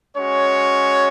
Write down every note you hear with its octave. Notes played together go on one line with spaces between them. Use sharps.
G#3 C#4 F#4 C#5